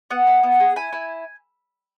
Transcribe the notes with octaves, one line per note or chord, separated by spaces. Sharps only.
B3 F#5
E4
B3
G#4
E4 G#5
E4